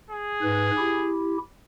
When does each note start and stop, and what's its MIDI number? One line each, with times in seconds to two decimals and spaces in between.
0.11 1.13 68
0.42 0.71 44
0.42 0.71 71
0.78 1.38 64
0.78 1.38 67